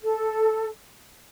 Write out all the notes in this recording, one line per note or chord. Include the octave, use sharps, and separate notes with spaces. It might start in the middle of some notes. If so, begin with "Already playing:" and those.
A4